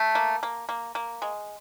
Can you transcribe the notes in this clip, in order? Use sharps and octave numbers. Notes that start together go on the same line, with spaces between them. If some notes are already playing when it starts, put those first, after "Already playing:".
Already playing: A3
A#3
A#3
A#3
A#3
G#3